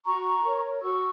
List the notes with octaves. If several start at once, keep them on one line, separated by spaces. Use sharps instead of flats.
F#4 A#5 C#6
A#4 C#5
F#4 C#6 E6